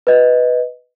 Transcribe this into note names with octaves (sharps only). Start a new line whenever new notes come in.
B4 D#5